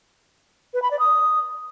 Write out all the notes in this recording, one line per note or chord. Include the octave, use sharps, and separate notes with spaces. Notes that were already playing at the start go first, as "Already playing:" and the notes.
B4
B5
D5
D#6